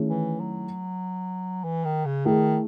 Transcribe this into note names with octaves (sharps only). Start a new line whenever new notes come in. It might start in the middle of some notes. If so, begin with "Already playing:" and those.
Already playing: D#3 A3 C#4 E4 G#4
E3
F#3
E3
D#3
C#3
D#3 A3 E4 G#4